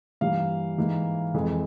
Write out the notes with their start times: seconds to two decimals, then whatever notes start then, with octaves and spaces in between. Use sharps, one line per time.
0.21 G2 E3 G3 A#3 F5
0.77 G#2 E3 A#3
1.34 F2 E3 G#3